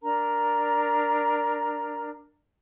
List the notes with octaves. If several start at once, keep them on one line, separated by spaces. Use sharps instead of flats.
D4 A#4 A#5